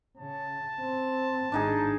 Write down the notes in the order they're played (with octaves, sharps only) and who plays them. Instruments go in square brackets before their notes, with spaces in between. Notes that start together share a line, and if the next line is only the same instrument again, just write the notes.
[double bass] C#3 [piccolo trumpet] A5
[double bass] C4
[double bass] G#1 G#2 [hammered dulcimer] D4 D#4 G#4